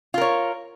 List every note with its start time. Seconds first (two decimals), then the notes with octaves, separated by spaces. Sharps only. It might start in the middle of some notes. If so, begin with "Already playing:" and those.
0.14 F4
0.18 A#4
0.21 C#5